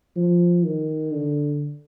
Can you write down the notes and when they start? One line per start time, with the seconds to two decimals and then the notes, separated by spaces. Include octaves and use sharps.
0.16 F3
0.64 D#3
1.12 D3